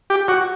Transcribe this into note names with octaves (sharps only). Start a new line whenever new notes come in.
G4
F#4